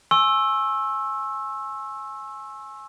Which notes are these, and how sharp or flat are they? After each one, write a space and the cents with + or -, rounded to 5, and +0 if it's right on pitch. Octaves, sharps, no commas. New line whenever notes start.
G#5 +15 C#6 -45 E6 +0